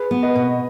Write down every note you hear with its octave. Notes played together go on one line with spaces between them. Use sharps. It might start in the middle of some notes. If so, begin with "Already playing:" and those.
Already playing: G#4 B4
B3
B4 D#5
B2